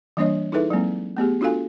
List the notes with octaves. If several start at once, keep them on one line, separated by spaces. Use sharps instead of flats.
E3 G3 A#3 D4 C#5 D#5
D#4 E4 G#4 A4 B4 E5
F#3 G#3 A#3 C4
A3 B3 G4 G#4
D4 F4 F#4 A4 F5 G#5